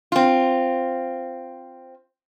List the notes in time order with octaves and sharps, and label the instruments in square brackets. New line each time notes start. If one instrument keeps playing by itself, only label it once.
[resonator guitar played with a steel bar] C4 F4